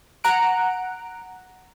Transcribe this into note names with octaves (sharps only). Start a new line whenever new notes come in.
F#5 A#5 F#6 D7